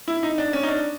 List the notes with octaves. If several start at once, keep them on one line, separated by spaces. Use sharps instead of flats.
E4
D#4
D4
C#4
D#4
D4